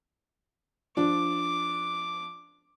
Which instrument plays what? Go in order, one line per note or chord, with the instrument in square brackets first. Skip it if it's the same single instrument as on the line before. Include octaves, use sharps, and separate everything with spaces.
[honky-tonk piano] F3 D4 [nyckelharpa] D6